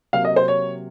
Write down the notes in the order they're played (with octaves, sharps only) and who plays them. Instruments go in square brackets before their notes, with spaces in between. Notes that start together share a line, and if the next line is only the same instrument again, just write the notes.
[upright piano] C3 F#3 A#3 F5
D#5
C5
C#5